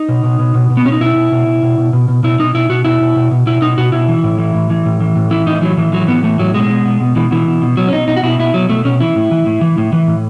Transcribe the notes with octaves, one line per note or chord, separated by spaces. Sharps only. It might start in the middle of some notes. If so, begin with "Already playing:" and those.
Already playing: D#4
B2
B2
B2
B2
B2
B3
B2 C#4
D#4
B2 E4
B2
B2
B2
B2
B2
B2
B2
B2 E4
B2 D#4
B2 E4
B2 F#4
B2 E4
B2
B2
B2
B2 E4
B2 D#4
B2 F#4
B2 E4
E3
A2
E3
A2
E3
A2
E3
A2
E3 E4
A2 D#4
E3 F#3
A2 E3
E3 F#3
A2 B3
E3 A3
A2 F#3
B2 G#3
B2
B2
B2
B2 E3
B2 E3
B2
B2
B2 F#3
C#4
B2 D#4
B2 D#4
F#4
B2 E4
B2 E4
B2 F#3
B2 A3
B2 C#4
E3 E4
A2
E3
A2
E3
A2
E3
A2